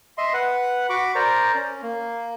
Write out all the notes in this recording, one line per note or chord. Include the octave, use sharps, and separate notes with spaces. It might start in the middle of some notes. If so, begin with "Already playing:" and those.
D#5 E5 C6
B4 F#5
F#4 B5 C#6 D6
A#4 C5 D5 A#5
C#4
A#3